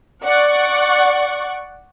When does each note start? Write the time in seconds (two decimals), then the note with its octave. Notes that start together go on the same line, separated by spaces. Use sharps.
0.25 D5 F#5 C#6